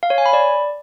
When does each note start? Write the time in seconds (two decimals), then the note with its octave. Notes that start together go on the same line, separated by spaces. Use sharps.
0.03 F5
0.10 C#5
0.18 G#5
0.26 B5
0.33 D5